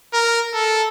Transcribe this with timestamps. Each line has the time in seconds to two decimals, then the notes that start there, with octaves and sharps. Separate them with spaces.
0.13 A#4
0.54 A4